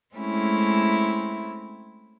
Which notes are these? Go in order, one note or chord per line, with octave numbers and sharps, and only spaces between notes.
G#3 A3 C4 C#4 E4